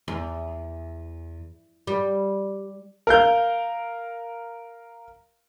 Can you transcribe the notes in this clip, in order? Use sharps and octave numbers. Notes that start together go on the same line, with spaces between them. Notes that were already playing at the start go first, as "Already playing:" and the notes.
E2
G3
A#4 F5 G6